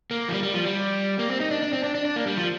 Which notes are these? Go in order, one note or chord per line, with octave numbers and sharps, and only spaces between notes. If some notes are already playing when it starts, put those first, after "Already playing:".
A#3
F3
G3
G3
F3
G3
A#3
C4
D#4
D4
D4
C4
D4
D4
D4
A#3
G3
F3